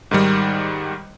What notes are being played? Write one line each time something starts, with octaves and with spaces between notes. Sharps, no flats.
G#2 D#3 G3